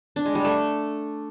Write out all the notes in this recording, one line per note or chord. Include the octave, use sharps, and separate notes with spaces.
D4
G#3
G3
A3